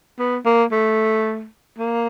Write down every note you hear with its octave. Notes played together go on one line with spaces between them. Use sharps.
B3
A#3
A3
A#3